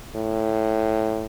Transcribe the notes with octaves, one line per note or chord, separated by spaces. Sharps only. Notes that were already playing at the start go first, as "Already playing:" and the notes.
A2